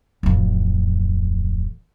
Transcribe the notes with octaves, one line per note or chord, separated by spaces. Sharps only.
D1 F2